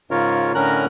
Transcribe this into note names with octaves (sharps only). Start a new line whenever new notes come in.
G#2 C#3 F4 A#4 C#5
A2 D3 C#4 A#4 A#5 F#6